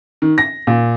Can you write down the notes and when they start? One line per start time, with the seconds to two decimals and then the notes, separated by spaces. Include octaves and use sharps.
0.22 D#3
0.38 A#6
0.67 A#2